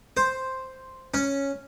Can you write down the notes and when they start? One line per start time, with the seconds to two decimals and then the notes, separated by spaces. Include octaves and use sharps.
0.17 C5
1.14 C#4